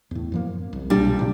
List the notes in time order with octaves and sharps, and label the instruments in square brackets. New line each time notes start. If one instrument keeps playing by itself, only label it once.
[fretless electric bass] E2 A2
F#2 F3 A#3
C2
[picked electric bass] B1 A#2 D4 [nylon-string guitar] G3
[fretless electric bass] A2 C3